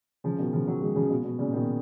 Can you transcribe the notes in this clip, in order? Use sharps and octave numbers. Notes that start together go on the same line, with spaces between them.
C#3 F3
B2 D#3
C#3 F3
D#3 F#3
F3 G#3
C#3 F3
B2
B2
A#2 C#3
B2 D#3